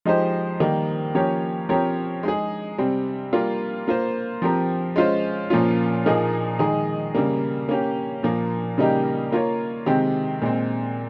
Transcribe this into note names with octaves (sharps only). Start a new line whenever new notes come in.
F3 G#3 D#4 G4 C5
D#3 G3 A#3
F3 A#3 C#4 G4 C#5
F3 C4 G4 A#4 C#5
G#3 D#4 G#4
C3 G3 C4
G3 A#3 F4
A#3 F4 C5
F3 C4 G4 A#4
G#3 C#4 F4 C5
A#2 F3 A#3 C#4 F4
A#2 F3 A#3 D#4 G#4
D#3 G#3 D#4 G#4
C#3 G3 A#3
A#3 C#4 G4
A#2 F3 A#3
C#3 G3 A#3 D#4 G4
A#3 F4 A#4 C#5
C3 D#3 G#3 C4 G4
A#2 G#3 C4